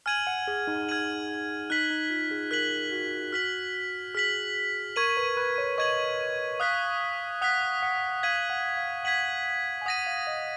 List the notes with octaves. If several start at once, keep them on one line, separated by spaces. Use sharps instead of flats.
G#5 F6 G#6 D#7 F#7
F#5
G#4
D#4
F6 G#6 D#7 F#7
D#4 F#6 B6 F#7
D#4
F4
G#4
A#4 F#6 B6 F#7
F#4
F#4 F6 B6 F#7
G#4 F6 B6 F#7
A#4 C#6 G#6 D#7 F#7
B4
B4
C#5
D#5 C#6 G#6 D#7 F#7
F5 D#6 F#6 B6
F#5 D#6 F#6 B6
F#5
F5 G#6 B6 D#7 F#7
F#5
F5
F#5 G#6 B6 D#7 F#7
G#5
F#5 D#6 A#6 D#7
F5
D#5